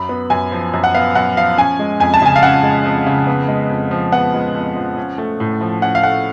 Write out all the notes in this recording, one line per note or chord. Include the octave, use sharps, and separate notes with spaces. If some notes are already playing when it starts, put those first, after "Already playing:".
Already playing: F#2 B5
B3
F#2 G#5
F3
F#2
F#5
B3 F5
F#2 F#5
F3 F5
C#4 G#5
G#3
F2 G#5
A5
C#3 G#5
F5
C#4 F#5
G#3
F2
C#3
B3
G#3
F2
F3
B3 F#5
G#3
F2
F3
C#4
A3
A2
F3
C#4 F#5
F5
A3 F#5